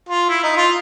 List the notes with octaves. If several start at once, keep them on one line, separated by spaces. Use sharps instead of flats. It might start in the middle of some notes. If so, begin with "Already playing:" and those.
F4
E4
D#4
F4